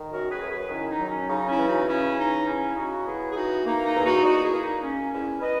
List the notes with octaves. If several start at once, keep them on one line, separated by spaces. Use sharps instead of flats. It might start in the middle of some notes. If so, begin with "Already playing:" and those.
Already playing: D#3
F#2 F#4 A#4
G#4 B4
F#2
G#4 B4
D#3 C#4 E4
D#4
F#3
C#4
C#3 D#4
C#4 E4
E3
D#4 F#4
C#3 C#4 E4
E3 D#4
C#3 C#4 E4
C#3 D#4 F#4
B3 E4 G#4
G#4
E3 D#4 F#4
A#3 D#4
D#4
E2
D#4 F#4
E2 D#4 F#4
E4 G#4
A#3
D#4
A#3 C#4
E2 C#4 E4
B4 D#5